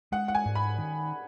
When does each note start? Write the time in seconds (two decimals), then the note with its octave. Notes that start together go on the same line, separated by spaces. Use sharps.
0.12 G#3 F#5
0.28 F#5
0.35 G#5
0.46 G#2
0.55 B5
0.78 D#3